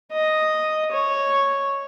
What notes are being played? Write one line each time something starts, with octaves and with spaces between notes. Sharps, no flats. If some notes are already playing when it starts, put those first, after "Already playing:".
D#5
C#5